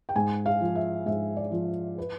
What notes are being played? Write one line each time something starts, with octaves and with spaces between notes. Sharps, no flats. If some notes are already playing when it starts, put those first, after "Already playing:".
G5
G#2 G#5
F5
F3
E5
G#2 E5
D5
F3
B4